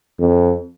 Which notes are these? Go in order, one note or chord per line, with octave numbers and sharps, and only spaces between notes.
F2